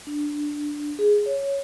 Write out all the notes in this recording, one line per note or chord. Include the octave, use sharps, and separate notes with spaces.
D4
G#4
C#5